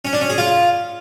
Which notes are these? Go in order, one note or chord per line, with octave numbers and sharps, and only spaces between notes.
C#4
D4
C#4
G#4
F4